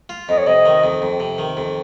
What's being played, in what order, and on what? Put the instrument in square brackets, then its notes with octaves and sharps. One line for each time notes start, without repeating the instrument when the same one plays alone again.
[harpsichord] F4
[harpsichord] F2 [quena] D#5
[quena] C#5
[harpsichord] C3 [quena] D#5
[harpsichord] D#3
F2
F2
C3
D#3
F2